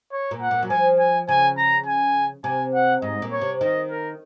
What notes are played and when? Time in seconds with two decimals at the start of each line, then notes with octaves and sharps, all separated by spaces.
0.12 C#5
0.31 A#2
0.41 F#5
0.51 A#2
0.63 F#3
0.70 F3 G#5
0.99 G#5
1.29 C#3 G#5
1.58 A#5
1.86 G#5
2.44 C3 G#5
2.74 F#5
3.02 G#2 D#5
3.22 A#2
3.32 C#5
3.41 C3
3.61 D#3 D#5
3.90 A#4